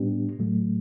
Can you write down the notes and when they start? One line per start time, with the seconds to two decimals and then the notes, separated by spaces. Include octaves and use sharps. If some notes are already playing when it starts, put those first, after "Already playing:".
Already playing: A2 G3 B3 D4 G4
0.39 A2 F#3 A3